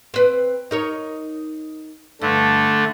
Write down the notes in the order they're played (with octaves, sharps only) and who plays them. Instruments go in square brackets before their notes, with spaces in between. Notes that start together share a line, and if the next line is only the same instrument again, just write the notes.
[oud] C4 B4
D#4 A#4 C#5
[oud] G2 [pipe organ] D3 A3